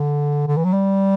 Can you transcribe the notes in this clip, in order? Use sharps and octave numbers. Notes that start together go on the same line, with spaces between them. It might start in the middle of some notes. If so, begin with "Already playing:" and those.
Already playing: D3
D3
E3
F#3
G3